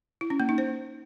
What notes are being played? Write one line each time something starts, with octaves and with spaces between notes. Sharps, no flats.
E4
C#4
A#3
D#4
C5